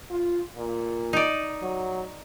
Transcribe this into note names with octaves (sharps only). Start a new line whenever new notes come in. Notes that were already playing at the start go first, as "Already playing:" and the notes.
F4
A#2
D#4 D5
F#3